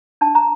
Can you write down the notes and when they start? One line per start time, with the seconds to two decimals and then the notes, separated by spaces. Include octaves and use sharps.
0.21 D4 A5
0.35 A#5